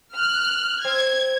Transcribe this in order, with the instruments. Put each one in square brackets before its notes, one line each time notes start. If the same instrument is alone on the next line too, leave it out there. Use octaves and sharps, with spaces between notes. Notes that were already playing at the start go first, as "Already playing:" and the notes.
[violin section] F6 F#6
[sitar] C4 [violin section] G#6